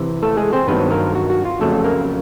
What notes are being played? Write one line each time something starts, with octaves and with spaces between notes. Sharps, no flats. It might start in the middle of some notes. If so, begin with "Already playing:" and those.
Already playing: C3 E3
A3 A4
G#3 G#4
C4 C5
G2 D#3 F#3 B3 B4
A#3 A#4
F#4
F#4
F4
F2 C#3 F#3 A3 A4
A#3 A#4